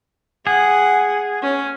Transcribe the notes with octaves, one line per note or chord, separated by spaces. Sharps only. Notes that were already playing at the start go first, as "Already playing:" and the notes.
G#4 F#5
C#4